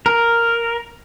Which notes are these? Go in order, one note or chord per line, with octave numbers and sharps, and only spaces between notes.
A#4